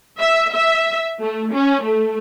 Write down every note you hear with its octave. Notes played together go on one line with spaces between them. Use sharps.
E5
E5
A3
C#4
A3